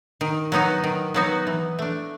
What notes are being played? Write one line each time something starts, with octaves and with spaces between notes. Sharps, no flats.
D#3
F#3 B3 D#4 F#4
D#3
F#3 B3 D#4 F#4
E3
A3 D4